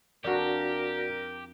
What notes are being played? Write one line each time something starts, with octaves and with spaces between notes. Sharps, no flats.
F2 D4 F#4 G4 A#4 D5 A#5